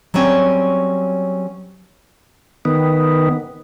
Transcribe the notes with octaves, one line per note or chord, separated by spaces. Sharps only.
F#3 G3 C4 C#4
D#3 B3